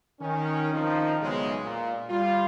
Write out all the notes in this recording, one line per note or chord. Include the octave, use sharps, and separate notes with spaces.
D#3 C#4
D#3 F3 C4 D#4
B1 E2 C#3 G#3
A#2
G3 F4